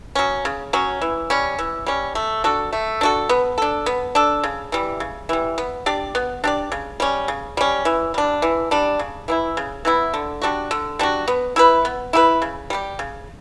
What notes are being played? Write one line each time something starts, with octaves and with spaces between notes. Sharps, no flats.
F#3 C#4
C#3
F#3 C#4
E3
G3 C#4
E3
G3 C#4
A3
D4 F#4 A4
A3
D4 F#4 A4
B3
D4 A4
B3
D4 A4
C#3
E3 G3
C#3
E3 G3
B3
D4 G4 D5
B3
D4 G4 D5
C#3
G3 C#4
C#3
G3 C#4
E3
G3 D4
E3
G3 D4
C#3
E3 B3 E4
C#3
E3 B3 E4
D3
G3 D4 F#4
D3
G3 D4 F#4
B3
E4 G4 B4
B3
E4 G4 B4
C#3
G3 D4 G4
C#3